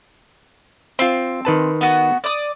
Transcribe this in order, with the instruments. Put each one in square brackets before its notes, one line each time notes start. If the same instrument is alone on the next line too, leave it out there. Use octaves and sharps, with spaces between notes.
[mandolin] C4 [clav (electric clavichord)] F4 C5
[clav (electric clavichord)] D#3 B4 A5
[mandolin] B3 F#4
D5 D#6